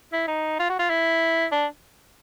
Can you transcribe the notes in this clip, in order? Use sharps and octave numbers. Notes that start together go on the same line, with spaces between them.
E4
D#4
F4
F#4
F4
E4
D4